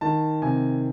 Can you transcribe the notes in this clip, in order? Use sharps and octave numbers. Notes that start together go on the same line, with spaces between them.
D#3 A5
C3 G#5